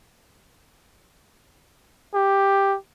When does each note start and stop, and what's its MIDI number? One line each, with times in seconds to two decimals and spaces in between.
2.14 2.76 67